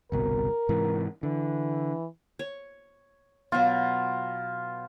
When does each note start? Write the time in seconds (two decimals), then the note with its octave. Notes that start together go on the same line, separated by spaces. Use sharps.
0.12 G1 C2 B2 A#4
0.69 G#2 C3 E3
1.23 D3 E3
2.39 C#5
3.52 B2 F#3 F4